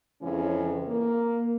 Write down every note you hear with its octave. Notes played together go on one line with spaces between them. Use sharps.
F2 C#3 E3 G#3 C#4
A#3